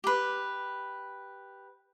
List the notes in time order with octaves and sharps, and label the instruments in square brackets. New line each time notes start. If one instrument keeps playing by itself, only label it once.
[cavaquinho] G4 B4